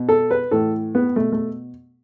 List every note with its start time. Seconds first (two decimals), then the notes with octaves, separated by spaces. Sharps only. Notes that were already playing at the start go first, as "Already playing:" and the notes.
Already playing: B2
0.09 A4
0.31 B4
0.51 A2 E3 A4
0.95 B3
1.16 B2 A3
1.32 A3